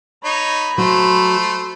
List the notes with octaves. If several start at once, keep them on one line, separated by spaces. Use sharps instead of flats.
D#4 C#5 B5
F#3 A3 C5